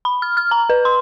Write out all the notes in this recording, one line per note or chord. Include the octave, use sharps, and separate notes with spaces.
B5
F6
F6
A#5
B4
C6